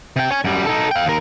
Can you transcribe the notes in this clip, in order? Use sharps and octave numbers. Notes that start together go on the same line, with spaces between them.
C3 G5
C#5 G#5
F#2 G3
D#4 A4
F5 G5
D#2 A#4